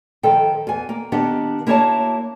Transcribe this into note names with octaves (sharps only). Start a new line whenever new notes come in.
D#3 F3 A4 G5
E2 G#5
A#3
D#3 B3 D4 G4 F#5
A#3 E4 F#4 C#5 G#5 A5